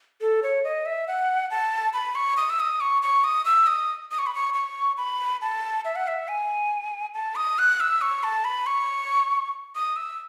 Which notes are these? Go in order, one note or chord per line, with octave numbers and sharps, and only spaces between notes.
A4
C#5
D#5
E5
F#5
A5
B5
C#6
D#6
E6
D#6
C#6
C#6
D#6
E6
D#6
D#6
C#6
B5
C#6
C#6
B5
A5
E5
F#5
E5
G#5
A5
D#6
F#6
E6
C#6
A5
B5
C#6
D#6
E6